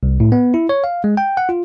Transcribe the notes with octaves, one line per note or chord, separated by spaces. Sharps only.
C2
A2
B3
E4
C#5
F5
G#3
G5
F#5
F4